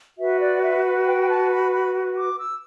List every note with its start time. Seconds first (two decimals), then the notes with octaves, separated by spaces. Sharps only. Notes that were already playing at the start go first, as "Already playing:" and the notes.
0.17 F#4 B4 E5
0.39 D5
0.61 E5
1.05 G5
1.23 G5
1.28 A5
1.50 B5
1.71 B5
2.15 D6
2.38 E6